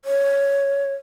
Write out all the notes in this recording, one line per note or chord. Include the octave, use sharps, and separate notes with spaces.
C#5